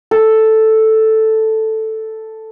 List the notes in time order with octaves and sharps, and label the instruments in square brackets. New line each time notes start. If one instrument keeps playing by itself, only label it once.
[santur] A4